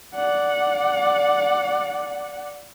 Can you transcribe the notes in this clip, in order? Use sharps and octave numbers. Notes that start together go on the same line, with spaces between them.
D5 F#5